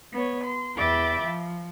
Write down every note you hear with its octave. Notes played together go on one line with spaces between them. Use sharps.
B3 C#5
C6
E2 E5 G5 B5 D6 A6
F3